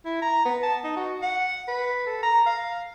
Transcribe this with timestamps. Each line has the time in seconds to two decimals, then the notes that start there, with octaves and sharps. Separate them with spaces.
0.05 E4
0.22 A#5
0.45 B3
0.63 A5
0.84 D#4
0.96 F#4
1.22 F#5
1.68 B4
2.06 A4
2.23 A#5
2.46 F5